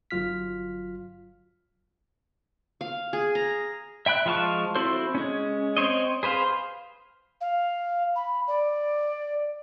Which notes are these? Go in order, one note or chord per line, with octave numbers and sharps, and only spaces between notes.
G1 F#3 F4 F6 B6
F5
G#4
A#5
E5 G5 B5 F#6
F3 G#3 F5 A5 C#6
C4 E4 F#4 A4 C5
G#3 C#4
C4 C5 C#5 D#5
G#4 B4 C5 F5
F5
B5
D5